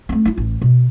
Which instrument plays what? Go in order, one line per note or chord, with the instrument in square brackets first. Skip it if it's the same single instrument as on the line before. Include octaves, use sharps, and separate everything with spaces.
[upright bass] A3 C4
E4 F4
A1
B2